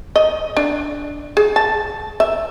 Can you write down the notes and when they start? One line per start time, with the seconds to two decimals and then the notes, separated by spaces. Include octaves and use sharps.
0.16 D#5
0.57 D4
1.37 G#4
1.56 A5
2.20 E5